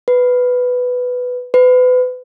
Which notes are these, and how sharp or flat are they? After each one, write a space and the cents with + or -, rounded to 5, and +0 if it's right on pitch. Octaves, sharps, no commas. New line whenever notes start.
B4 +5
B4 +30